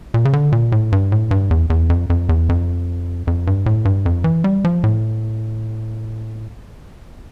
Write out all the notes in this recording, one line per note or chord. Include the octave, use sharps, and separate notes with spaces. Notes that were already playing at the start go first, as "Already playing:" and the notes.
A#2
C#3
D3
A#2
A2
G2
A2
G2
E2
E2
F2
F2
E2
F2
F2
G2
A2
G2
F2
E3
G3
F3
A2